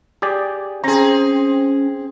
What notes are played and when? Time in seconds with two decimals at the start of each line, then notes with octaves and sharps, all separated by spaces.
0.22 G4 G#4 D5
0.84 C4 C#4 G#4 A#5